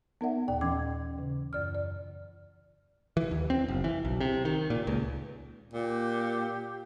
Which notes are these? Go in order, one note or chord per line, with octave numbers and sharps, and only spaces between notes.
B3 D#4 A#4 D5 E5 F#5
D#2 A#2 D5 G5
E3 C#4 D6 G#6
C#3
F#2 D5 F6
D5
E3
D#2
C4
F#1
E3
B1
C3
D#3
A#2
C#2
A#2 G4